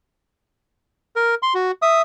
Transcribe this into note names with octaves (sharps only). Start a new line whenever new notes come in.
A#4
C6
F#4
E5 D#6